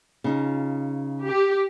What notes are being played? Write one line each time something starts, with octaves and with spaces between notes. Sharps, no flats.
C#3 D#4 F4
G4